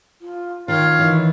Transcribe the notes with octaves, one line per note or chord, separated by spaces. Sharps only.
F4
D#3 F4 C#5
D#3 E3